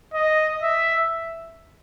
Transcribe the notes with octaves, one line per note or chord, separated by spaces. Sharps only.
D#5
E5